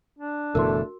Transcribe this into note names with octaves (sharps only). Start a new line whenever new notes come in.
D4
F#1 B2 E3 A3 F#4 A#4